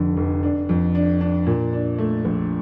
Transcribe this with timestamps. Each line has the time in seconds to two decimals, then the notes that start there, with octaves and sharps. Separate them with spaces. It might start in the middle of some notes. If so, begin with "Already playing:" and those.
Already playing: F1 F2 D3
0.17 F1
0.43 D4
0.69 F2
0.95 D4
1.21 D4
1.46 A#2
1.73 D4
1.98 A3
2.25 A#1